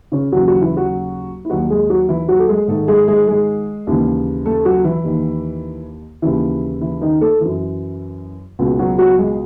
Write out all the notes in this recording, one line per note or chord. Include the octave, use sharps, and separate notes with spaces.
C#3 C#4
D#2 C#3 E3 F#3 F#4
F#3 F#4
E3 E4
F#3 F#4
E4
D#2 D#3 F#3 F#4
G#3 G#4
F#3 F#4
E3 E4
F#3 F#4
A4
G#3 G#4
G#2 D#3 A3 A4
G#3 G#4
G#3 G#4
G#3 G#4
D#2 C#3 E3
A3 A4
F#3 F#4
E3 E4
D#2 D#3
D#2 C#3 E3 E4
E3 E4
D#3 D#4
A3 A4
F#2 E3
C#2 B2
F#3 F#4
F#3 F#4
G#3 G#4